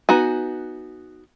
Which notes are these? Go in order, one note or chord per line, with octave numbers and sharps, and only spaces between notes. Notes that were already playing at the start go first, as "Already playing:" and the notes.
B3 D#4 F#4 G#5